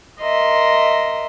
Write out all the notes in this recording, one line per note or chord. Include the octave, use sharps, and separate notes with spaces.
A#4 D#5 E5 C6